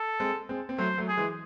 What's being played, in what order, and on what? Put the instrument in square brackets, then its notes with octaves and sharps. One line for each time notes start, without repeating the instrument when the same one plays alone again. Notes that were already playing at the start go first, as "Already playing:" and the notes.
Already playing: [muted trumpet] A4
[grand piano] G#3 C4
G#3 C4
C4
[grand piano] F#3 A3 [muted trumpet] C5
[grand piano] F#3 A3
[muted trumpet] G#4
[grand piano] E3 G#3